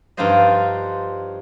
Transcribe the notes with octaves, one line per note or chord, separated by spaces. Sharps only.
G2 F3 D#4 F4 C5 D#5